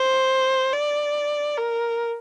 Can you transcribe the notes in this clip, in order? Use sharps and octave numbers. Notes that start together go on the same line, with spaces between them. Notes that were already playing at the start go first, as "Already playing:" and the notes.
Already playing: C5
D5
A#4